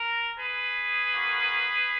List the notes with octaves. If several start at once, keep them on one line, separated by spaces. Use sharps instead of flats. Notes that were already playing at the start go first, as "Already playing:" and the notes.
Already playing: A#4
G#4 B4
A#3 C#4 F#4